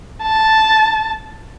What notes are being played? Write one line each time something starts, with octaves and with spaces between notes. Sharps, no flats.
A5